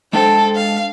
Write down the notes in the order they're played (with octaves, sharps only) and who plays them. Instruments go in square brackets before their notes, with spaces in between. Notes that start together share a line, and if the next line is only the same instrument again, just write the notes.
[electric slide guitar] G#3 D4 G5 [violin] A4 C5
[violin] F5